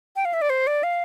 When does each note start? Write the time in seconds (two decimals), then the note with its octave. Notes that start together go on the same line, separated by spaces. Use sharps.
0.16 G5
0.25 F5
0.33 E5
0.42 D5
0.50 C5
0.67 D5
0.83 F5